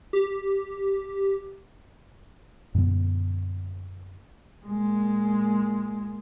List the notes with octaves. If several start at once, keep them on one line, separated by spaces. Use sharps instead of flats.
G4
F#2 A#2 D3 B3
A#2 G#3